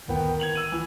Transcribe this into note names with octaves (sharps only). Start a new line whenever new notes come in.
D1 D#3 B3 G5
G#6 F7 F#7
E6 D#7
E3